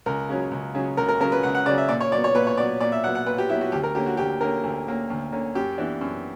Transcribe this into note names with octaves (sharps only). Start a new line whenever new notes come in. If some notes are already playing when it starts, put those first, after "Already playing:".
C#2 A#4
C#3 F#3 C#4
C#2
C#3 F#3 C#4
C#2 A#4
A#4
C#3 F#3 C#4 A#4
B4
C#2 F#5
F#5
C#3 F#3 C#4 D5
E5
A#2 D5
C#5
F#3 B3 D5
C#5
A#2 B4
C#5
F#3 B3 D5
A#2 D5
E5
F#3 B3 F#5
F#5
A#2 B4
G4
F#3 B3 E4
F#4
D2 G4
A#4
D3 A#3 C#4 G4
F#4
D2 G4
D3 A#3 C#4 A#4
D2
D3 A#3 C#4
D2
D3 A#3 C#4
F#2 G4
E3 B3 D4
F#2